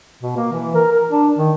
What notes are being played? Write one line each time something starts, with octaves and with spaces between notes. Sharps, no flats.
B2
A#3
E3
A#4
A#4
D4
D#3